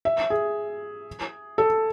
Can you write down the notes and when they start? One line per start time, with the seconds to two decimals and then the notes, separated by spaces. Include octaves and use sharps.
0.05 E5
0.30 G#4
1.58 A4